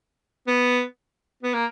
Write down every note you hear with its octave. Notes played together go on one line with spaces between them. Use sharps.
B3
B3
A#3